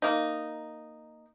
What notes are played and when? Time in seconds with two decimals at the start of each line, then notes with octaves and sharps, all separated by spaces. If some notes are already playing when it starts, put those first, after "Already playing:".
0.02 A#3 D#4